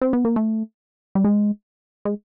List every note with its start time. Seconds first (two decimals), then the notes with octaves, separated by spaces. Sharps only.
0.01 C4
0.13 B3
0.25 A#3
0.36 A3
1.15 G3
1.24 G#3
2.05 G#3